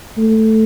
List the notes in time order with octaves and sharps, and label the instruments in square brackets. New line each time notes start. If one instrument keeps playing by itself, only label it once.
[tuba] A3